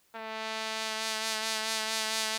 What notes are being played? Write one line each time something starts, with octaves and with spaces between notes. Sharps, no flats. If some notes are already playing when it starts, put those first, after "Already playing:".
A3